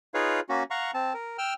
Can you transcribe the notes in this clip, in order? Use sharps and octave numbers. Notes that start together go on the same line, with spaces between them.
D#4 F4 G#4 B4 C#5 F5
A#3 C#4 F#4
F5 F#5 A#5 C#6
C4 A5
A#4
G5 E6 F6